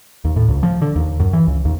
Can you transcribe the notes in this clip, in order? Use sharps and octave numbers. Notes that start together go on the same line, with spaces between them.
D#2
A2
C#2
F3
D3
D#2
F#2
E3
C#2
D#2